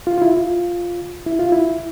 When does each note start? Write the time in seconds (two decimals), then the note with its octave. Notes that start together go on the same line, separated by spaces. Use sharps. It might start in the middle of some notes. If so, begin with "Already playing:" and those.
0.07 F4
0.18 F4
0.22 E4
0.37 F4
1.26 E4
1.39 F4
1.52 E4